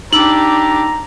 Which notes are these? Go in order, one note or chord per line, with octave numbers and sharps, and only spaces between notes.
D4 D#4 G4 A#5 B5 E6 F#7